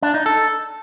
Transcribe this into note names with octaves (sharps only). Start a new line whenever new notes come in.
D4
D#4
A4